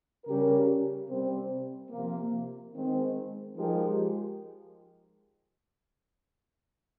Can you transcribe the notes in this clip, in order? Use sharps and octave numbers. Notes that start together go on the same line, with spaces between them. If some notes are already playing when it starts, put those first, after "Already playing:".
C#3 G3 C#4 G4 A#4
C3 G3 C4
C3 F3 A#3
D#3 G#3 C4
F3 G#3 D#4 G4 A#4